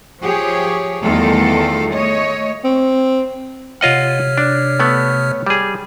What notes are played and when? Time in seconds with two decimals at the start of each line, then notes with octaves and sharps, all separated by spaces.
0.21 F3 G4 G#4 C#5
1.03 E2 D#3 G3 A3 F4 A4
1.91 A3 C#5 D#5
2.64 C4
3.81 C3 F4 C#5 D#5 F#5 F6
4.38 D4
4.80 A3 B3
5.46 G3 G#4